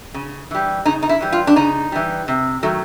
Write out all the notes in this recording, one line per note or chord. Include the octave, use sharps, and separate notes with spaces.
C#3
E3 G3
C#3 D#4
D#4
E4
E3 G3
F4
D4
C#3 D#4
E3 G3
C3
D#3 F#3 A3